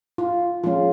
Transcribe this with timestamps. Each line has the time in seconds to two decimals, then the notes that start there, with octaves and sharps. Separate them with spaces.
0.18 F4
0.64 F3 G#3 C#4 F4